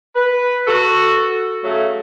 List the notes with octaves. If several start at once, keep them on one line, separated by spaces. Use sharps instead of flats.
B4
F#4 A4
C#3 F#3 A3